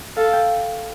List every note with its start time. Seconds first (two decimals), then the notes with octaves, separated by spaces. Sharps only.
0.16 A4 F5
0.33 G5